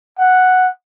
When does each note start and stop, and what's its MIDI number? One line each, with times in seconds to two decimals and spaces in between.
0.19 0.68 78